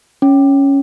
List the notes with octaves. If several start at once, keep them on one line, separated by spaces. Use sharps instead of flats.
C#4